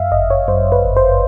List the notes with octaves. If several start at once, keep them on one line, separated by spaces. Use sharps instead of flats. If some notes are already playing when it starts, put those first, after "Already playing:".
Already playing: F#2 E5 F5
G1 D#5
C#5
F#2 C5
B4
G1
C5